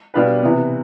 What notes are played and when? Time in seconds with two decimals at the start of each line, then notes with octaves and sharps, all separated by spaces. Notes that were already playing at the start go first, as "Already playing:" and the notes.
0.14 B2 G3 D4 F4 B4
0.43 C3 E3 B3